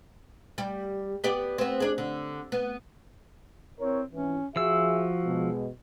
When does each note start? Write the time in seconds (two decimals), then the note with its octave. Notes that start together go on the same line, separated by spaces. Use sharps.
0.58 G3 G4
1.24 B3 G4 D5
1.58 B3 C4
1.80 D4 G#4
1.98 D3
2.52 B3
3.79 C4 E4 A#4 C#5
4.12 G#1 E3 C#4
4.56 F3 F#4 G#4 E5 E6
5.25 B2 G#3